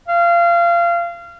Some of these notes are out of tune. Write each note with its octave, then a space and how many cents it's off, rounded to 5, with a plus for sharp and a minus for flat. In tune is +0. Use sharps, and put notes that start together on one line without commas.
F5 -25